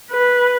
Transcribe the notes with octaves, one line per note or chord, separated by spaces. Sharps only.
B4